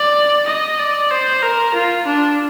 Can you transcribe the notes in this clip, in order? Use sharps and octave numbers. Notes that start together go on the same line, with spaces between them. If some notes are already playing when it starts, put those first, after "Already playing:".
Already playing: D5
D#5
D5
C5
A#4
F4
D4